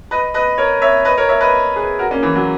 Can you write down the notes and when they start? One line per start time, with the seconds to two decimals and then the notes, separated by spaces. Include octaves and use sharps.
0.11 B4 D#5
0.34 B4 D#5
0.58 A#4 C#5
0.82 C#5 E5
1.05 B4 D#5
1.17 A#4 C#5
1.29 C#5 E5
1.41 B4 D#5
1.76 G#4 B4
1.99 F#4 A#4
2.11 A#3 C#4
2.23 E3
2.36 F#3